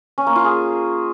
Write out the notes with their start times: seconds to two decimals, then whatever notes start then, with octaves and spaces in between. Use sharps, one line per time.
0.18 C#4
0.27 A#3
0.36 F4
0.45 G#4